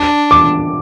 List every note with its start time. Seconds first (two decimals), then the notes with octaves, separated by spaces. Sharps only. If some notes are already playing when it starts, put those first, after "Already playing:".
Already playing: D4
0.31 D6